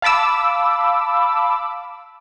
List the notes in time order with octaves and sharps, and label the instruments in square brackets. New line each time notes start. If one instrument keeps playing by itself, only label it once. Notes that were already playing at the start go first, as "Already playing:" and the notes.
[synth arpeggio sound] F5 A5 B5 D6 E6